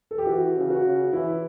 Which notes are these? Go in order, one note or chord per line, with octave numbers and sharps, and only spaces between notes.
A4
G4
E3 F#4
C#3
F#4
C#3
E3 E4